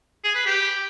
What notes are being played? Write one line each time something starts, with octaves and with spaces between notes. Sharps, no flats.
G#4
B4
G4